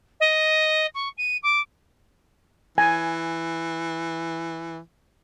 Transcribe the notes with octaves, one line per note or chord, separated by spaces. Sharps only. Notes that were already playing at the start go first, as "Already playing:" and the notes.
D#5
C#6
D#7
D6
E3 G#5